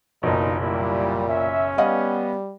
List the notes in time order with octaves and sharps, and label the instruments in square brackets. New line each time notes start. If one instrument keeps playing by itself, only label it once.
[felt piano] F#1 B1 [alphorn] A#2 [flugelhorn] D#4
[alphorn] A#2 [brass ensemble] F#3 G3 [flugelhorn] E4
[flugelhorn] C#4 [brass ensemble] E5
[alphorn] G3 [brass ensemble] B3 [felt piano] D#5 F5 F#5